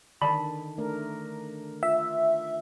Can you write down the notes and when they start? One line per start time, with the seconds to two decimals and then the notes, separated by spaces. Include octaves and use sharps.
0.22 D3 D#3 D5 A5 B5
0.78 A3 D4 A#4
1.83 F4 E5